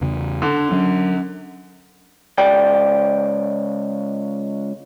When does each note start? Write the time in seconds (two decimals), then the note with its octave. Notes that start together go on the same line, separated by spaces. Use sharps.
0.01 E2 C#3
0.42 D3 D4
0.72 F#3 C#4
2.38 C#2 D5 G5